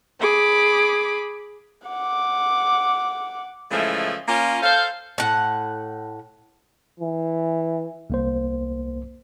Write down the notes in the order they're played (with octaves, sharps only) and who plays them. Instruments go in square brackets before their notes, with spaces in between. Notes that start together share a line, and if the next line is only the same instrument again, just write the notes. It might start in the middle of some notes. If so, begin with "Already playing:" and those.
[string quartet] G#4 B5 D6
[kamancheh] F#5 D6
[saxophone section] A2 C#3 E3 F3 G#3 A3
A#3 C#4 F4
A4 C5 F5
[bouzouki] A2 F#5
[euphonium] E3
[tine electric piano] C2 A#3 C5